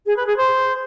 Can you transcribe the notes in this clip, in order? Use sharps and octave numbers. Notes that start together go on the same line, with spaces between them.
G#4
B4
G#4
C5